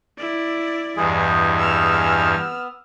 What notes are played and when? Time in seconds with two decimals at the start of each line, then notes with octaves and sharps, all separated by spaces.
0.18 E4 D5
0.97 E2 G2 G#3 G#4
1.58 E6 F6
2.38 B3